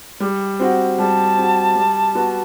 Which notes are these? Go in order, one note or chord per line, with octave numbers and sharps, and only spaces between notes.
G3
C4 F#4
G3 A5
C4 F#4
G3
B3 F#4